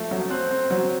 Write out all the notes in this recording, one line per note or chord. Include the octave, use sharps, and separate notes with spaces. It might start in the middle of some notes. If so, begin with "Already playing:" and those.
Already playing: F3 A3
F#3
C4 F#6
C4
F#3